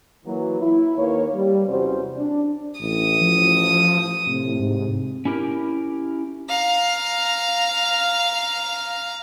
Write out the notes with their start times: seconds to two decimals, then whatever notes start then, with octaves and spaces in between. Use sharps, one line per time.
0.25 E3 F#3 A#3
0.61 E4
0.97 D#2 A#3 B4 C#5
1.34 G3
1.67 E2 C3 G3 C#4 F#4 C5
2.15 D4
2.81 A1 D#6
3.21 F3
4.27 A2 C3
4.60 G#2
5.25 C#4 E4 G4 A#4
6.49 F5 A#5